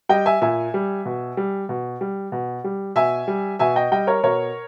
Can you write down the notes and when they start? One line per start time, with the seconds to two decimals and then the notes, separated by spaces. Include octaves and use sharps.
0.09 G3 D#5 G5
0.26 E5 G#5
0.41 A#2 E5 G#5
0.74 G3
1.05 B2
1.37 G3
1.69 B2
2.01 G3
2.32 B2
2.64 G3
2.96 B2 E5 G#5
3.28 G3
3.59 B2 E5 G#5
3.76 D#5 G5
3.92 G3 D#5 G5
4.07 A#4 C#5
4.23 B2 A#4 C#5